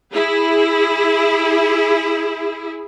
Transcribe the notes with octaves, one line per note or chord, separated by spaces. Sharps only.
E4 G#4